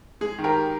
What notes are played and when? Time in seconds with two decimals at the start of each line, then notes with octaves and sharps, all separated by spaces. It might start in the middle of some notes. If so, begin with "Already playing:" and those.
0.21 G#3 G#4
0.38 D#3
0.44 G4 A#4